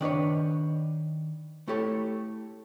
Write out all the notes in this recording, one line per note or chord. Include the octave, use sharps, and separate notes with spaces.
D#3 D4 B4 C#5
A3 E4 G4 A4 C#5